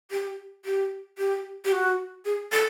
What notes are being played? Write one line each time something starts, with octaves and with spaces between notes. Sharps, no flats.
G4
G4
G4
G4
F#4
G#4
A4